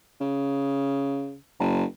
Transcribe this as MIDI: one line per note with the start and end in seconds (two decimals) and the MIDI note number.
0.21 1.36 49
1.59 1.84 30